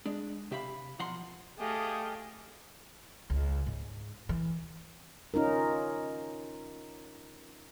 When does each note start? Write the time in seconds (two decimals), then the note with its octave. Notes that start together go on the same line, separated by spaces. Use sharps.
0.06 G#3 D4
0.51 C3 G4 E5 F5 B5
0.99 B1 F3 F#5 A#5 C6
1.59 A3 G4 G#4 D#5 F5
3.30 C#2
3.67 G#2
4.29 E3
5.34 C#4 D#4 F4 A#4